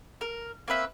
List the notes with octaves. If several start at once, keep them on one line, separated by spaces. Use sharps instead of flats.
A#4
A#3 C4 B4 E5